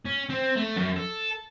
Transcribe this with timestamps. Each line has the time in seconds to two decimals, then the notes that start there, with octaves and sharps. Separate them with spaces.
0.06 C#4
0.30 C4
0.57 A3
0.76 F#2
0.96 A4